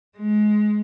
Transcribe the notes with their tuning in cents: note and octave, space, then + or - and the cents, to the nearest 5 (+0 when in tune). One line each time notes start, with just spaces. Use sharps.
G#3 +20